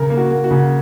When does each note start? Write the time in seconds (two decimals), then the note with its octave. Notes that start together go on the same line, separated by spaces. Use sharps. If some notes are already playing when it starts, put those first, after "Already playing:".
Already playing: C#3 A#4
0.10 A#3
0.17 F#4
0.31 A#3
0.44 F#4
0.51 C#3